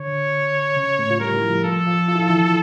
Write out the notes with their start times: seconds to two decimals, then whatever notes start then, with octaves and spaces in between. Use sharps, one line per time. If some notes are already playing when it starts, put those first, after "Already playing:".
Already playing: D3 C#5
0.76 C#3
0.98 A2 A3
1.11 F4
1.20 G3 G4 A#4
1.36 E4
1.42 F3 F4
1.64 F3 F4 A4
1.87 F3 F4
2.08 F4
2.16 E4
2.22 F3 F4
2.30 E3 E4